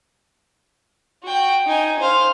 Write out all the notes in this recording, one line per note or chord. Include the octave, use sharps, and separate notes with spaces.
F#4 G5
D#4 G#5
C5 F5